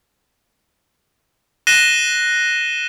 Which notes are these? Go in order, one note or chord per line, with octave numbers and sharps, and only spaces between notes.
F#6 A#6 C7 D#7 E7 G7